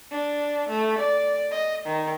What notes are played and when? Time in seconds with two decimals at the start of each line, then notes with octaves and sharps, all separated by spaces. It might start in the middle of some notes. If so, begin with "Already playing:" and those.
0.11 D4
0.69 A3
0.98 D5
1.51 D#5
1.86 D#3